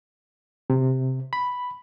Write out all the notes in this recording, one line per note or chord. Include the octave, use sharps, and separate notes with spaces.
C3
B5